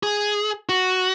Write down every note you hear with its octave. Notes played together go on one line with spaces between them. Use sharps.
G#4
F#4